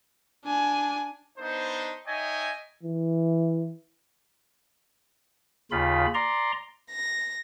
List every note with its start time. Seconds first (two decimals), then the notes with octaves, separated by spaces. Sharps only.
0.45 D4 G#5
1.38 B3 D4 D#4 C5
2.07 D#4 C#5 D#5 E5 G5 G#5
2.83 E3
5.71 D#2 C#3 F4 B5
6.14 D5 A#5 C6
6.91 A#6